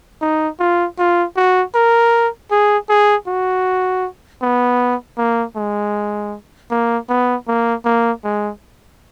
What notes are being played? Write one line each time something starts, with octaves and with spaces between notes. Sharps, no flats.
D#4
F4
F4
F#4
A#4
G#4
G#4
F#4
B3
A#3
G#3
A#3
B3
A#3
A#3
G#3